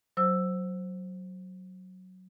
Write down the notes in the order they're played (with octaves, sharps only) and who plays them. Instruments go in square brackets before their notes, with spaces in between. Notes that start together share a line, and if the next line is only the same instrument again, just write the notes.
[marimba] F#3 C5 E6